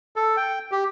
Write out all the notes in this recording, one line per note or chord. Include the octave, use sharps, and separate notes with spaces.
A4
G5
G4